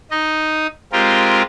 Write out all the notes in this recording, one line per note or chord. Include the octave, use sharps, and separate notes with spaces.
D#4 D#5
G#3 C4 F4 G4 A#4